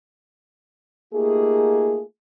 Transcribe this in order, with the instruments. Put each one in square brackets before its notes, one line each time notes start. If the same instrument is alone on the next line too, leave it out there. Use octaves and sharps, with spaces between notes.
[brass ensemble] A3 A#3 D#4 F4 G4 G#4